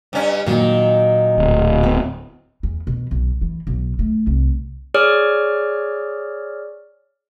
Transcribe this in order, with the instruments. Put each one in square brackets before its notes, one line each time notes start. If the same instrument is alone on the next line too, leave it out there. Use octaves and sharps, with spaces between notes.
[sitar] G2 C#4
[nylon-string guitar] A#2 F#3 [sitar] D#3
[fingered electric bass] D1
[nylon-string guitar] B3
[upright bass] E2
B2
B1
E3
B1
A3
C2
[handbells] G#4 C#5 D5 F6